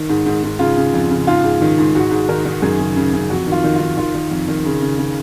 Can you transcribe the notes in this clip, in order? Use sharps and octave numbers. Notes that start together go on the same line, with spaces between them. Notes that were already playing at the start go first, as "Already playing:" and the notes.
Already playing: D#3
G#2
G#2
G#2
C#3 F4
C#3
F2
C#3
G#2 F4
G#2
D#3
G#2
G#2 F#4
G#2
D#3 A#4
D#3
F#2 G#4
C#3
C#3
C#3
F2 F#4
D#3 F4
D#3
F4
D#3
D#3 F4
D#3
F2
D#3
C#3
C#3
C#3